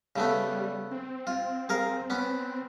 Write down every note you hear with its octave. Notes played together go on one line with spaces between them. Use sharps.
C#3 G3 A3 B3
C4
F4
G#4 A#4 F5
B3 C#4